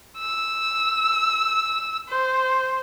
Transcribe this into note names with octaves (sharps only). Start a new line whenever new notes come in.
E6
C5